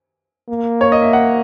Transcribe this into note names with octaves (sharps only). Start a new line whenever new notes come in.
A#3
C#5
D#5
E5
F#5